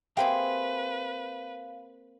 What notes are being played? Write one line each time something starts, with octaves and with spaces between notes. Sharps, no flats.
A#3 C4 G4 G#4 B4 E5 F5 G5